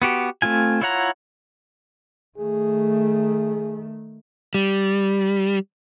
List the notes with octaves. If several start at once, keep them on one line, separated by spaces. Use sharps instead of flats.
B3 F#4 G4
A3 C4 F4 G#5
E4 F4 C#5 F#5 A#5
D#3 A3 G#4
G3